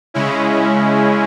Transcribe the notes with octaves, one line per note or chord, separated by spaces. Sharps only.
C#3 G#3 C#4 E4